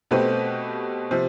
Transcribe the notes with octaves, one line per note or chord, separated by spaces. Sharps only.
B2 A3 C4 G4 B4
C3 F3